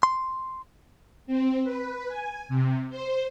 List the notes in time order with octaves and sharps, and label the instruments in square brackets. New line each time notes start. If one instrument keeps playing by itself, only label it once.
[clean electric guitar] C6
[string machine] C4
B4
G#5
C3
C5